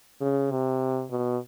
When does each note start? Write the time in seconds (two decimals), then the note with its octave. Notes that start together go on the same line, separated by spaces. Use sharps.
0.21 C#3
0.51 C3
1.11 B2